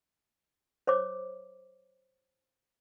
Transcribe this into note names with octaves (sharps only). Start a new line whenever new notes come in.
C5 C#5 D6